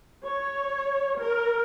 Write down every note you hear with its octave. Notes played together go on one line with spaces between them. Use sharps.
C#5
A#4